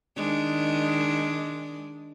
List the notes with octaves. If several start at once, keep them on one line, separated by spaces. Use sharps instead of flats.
D#3 G#3 D4